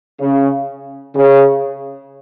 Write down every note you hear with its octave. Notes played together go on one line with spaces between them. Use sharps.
C#3
C#3